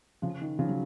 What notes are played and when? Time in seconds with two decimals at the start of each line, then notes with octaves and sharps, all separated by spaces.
0.22 C#3 F3
0.42 D#3
0.59 C#3 F3
0.69 F#3